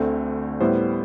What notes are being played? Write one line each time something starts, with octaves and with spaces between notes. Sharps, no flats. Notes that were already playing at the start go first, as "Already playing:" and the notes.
Already playing: D2 D3 A3 C4
A2 G3 B3 E4 C5